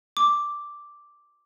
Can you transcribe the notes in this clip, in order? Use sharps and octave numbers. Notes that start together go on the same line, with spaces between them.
D6